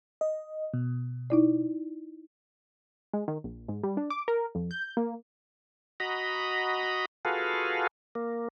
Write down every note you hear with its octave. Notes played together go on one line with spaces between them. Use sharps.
D#5
B2
D#4 E4 D5
G#3
D#3
A#1
G#2
G3
D4
D6
A#4
F2
G6
A#3
F#4 D#5 A#5 B5
F4 F#4 G#4 A4 B4 F5
A#3